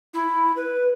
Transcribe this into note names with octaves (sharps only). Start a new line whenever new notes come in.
E4
B4